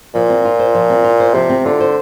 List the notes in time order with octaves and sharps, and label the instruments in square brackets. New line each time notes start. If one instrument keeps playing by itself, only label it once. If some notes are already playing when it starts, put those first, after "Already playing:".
[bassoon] A#2 [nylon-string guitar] F3
[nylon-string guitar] C4
F4
C5
F3
C4
F4
C5
[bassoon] C3 [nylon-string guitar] F3
[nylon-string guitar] C4
[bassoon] D3 [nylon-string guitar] F4
[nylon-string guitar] C5